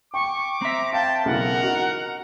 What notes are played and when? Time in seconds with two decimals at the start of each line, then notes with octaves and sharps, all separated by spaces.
0.14 G5 C#6 D6
0.62 C4 E5 A#5
0.93 F5 G5 A5
1.26 B1 C#3 E3 A#4 F#5
1.63 D#4 F#4